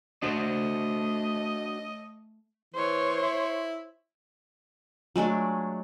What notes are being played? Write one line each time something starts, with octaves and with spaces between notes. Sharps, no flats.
A3 D4 F#4 C5 D#5
E3 C5 C#5
E4
F#3 G#3 A3 D4